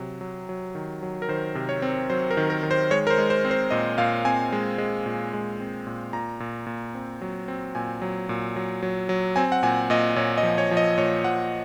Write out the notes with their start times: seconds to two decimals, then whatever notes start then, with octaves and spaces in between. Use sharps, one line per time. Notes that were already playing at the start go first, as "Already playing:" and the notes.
Already playing: C3 F#3
0.21 F#3
0.49 F#3
0.75 D#3
1.02 F#3
1.22 A#4
1.29 D#3 C5
1.55 C3
1.69 C#5
1.82 C4
2.10 F#3 C5
2.30 A#4
2.37 D#3
2.50 A#4
2.63 D#3
2.71 C5
2.91 G#3 C#5
3.07 A#4
3.10 C5
3.18 G#3
3.30 C5
3.44 C4
3.51 C5
3.71 A#2 D#5
3.98 A#2 F5
4.25 C4 G#5
4.52 G#3
4.78 G#3
5.06 A#2
5.33 G#3
5.60 C4
5.87 A#2
6.13 A#2 A#5
6.40 A#2
6.67 A#2
6.95 C4
7.21 F#3
7.48 C4
7.75 A#2 G#5
8.02 F#3
8.29 A#2
8.56 F#3
8.83 F#3
9.09 F#3
9.36 C4 G#5
9.52 F#5
9.63 A#2 G#5
9.90 A#2 D#5
10.16 A#2 C#5
10.38 D#5
10.43 F3
10.58 C#5
10.71 F3
10.77 D#5
10.98 A#2 C#5
11.24 F3 F#5